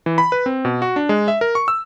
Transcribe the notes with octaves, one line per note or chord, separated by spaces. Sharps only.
E3
B5
B4
C4
B2
F#4
D4
G#3
E5
A#4
C#6
E6